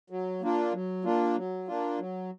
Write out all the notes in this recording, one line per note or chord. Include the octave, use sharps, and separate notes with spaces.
F#3
A#3 D4 F4
F#3
A#3 D4 F4
F#3
A#3 D4 F4
F#3